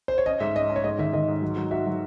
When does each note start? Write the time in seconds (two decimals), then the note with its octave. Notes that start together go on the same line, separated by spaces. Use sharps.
0.08 C5
0.18 C#5
0.26 C#4 D#5
0.40 G#2 E5
0.55 C#4 D#5
0.70 C#4
0.76 C#5
0.84 G#2 D#5
0.98 D#3 E5
1.13 D#3 D#5
1.28 G#2
1.42 F#3
1.56 F#3
1.71 F#4 E5
1.86 F#3